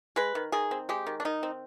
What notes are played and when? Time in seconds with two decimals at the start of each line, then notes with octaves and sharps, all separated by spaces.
0.16 G#3 B4
0.35 D#3
0.52 D#3 G#4
0.71 C4
0.89 G#3 G4
1.07 D#3
1.20 D4
1.25 D#3 D#4
1.43 C4